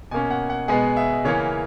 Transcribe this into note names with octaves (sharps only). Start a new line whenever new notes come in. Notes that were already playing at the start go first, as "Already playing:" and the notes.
B2 A#3 C#4 G#5
F#5
F#5
B2 G#3 B3 G#4
E5
C#3 E3 A#3 C#4 C#5